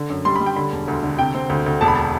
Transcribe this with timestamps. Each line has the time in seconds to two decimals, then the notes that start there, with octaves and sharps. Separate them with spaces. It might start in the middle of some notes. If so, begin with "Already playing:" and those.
Already playing: D3
0.10 F#2
0.25 G3 C6
0.36 B5
0.40 G3
0.46 G5
0.56 D3 B5
0.72 E1
0.88 D2
1.03 D3
1.19 C3 G5
1.35 C4
1.49 D2
1.66 D2
1.81 E1 A5
1.88 B5
1.96 A5